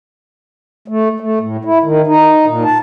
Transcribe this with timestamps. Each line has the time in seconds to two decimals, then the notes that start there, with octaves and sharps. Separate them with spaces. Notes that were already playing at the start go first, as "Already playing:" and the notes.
0.88 A3
1.20 A3
1.40 A2
1.65 E4
1.83 D#3
2.07 D#4
2.46 A#2
2.64 A5